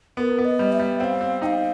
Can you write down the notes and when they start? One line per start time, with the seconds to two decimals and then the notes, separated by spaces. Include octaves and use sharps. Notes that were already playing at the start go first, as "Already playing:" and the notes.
0.17 B3 A#4
0.38 B3
0.45 D#5
0.59 G3
0.72 E5
0.79 G3
1.00 C4 F5 G5
1.21 C4
1.42 D#4 G5
1.46 F5